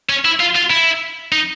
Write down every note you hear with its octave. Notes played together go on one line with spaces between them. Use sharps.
C#4
E4
F4
F4
E4
D#4